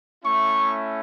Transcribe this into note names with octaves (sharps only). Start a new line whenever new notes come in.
A3 C#4 E4 C#6